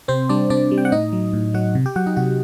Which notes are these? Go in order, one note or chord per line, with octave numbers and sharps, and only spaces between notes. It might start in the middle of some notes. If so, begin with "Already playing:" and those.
C3 C4 C5
G3 D4 D5
C3 D4 D5
G3
G5
F#5
A2 D#4 D#5
F#3
A2
F#3 F#4 F#5
C3
G4 G5
F#3 F#4 F#5
D#4 D#5
C3 F#4 F#5